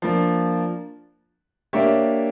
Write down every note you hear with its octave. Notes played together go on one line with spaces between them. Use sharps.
F3 A#3 D4
A#3 D4 G4 C#5 E5